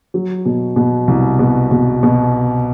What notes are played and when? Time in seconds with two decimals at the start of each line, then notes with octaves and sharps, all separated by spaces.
0.14 F#3
0.45 B2
0.76 B2
1.08 C2
1.39 B2
1.71 B2
2.03 B2